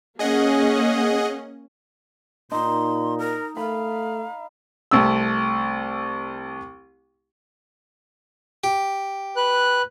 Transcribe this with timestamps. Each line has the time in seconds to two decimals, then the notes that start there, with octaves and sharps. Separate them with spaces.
0.19 A#3 C#4 G#4 D#5 F#5
2.52 A#2 D#4 C6
3.19 A#4
3.57 A3 F5 B5
4.91 C2 A3 E6
8.64 G4
9.36 B4 F#6